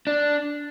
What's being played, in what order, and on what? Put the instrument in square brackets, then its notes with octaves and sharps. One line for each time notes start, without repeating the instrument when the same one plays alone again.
[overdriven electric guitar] D4